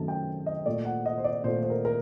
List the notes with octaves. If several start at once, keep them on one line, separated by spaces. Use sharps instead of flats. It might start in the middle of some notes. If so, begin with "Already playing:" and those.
Already playing: F#2 D#3 A3 A5
G5
D#5
A#2 A3 D5
F#5
D#5
C5
D5
A#2 A3 C5
C5
A#4
A#4